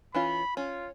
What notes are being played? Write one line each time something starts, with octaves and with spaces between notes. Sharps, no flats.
E3 C#4 F4 B5
C#4 F4